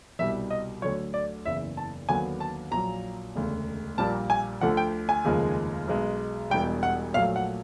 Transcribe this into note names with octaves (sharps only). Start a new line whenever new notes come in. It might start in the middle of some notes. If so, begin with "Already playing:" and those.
C2 B2 G3 E5
D#5
D2 D3 F#3 C#5
D5
F#1 E2 C#3 E5
A5
D#2 D3 F#3 B3 G#5
A5
A#1 A#2 F#3 A#5
E1 D2 C#3
A#1 A#2 G3 A#3 A5
G#5
D2 D3 F3 F#5
G5
G#5
F1 D#2 C#3 F3 G#3
B1 B2 G#3
E1 E2 B2 G3 G5
F#5
A#1 A#2 F#3 A3 F5
F#5